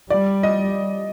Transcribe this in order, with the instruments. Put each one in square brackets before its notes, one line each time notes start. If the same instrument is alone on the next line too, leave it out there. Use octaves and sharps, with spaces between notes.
[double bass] G3 [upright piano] D5
[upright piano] D#5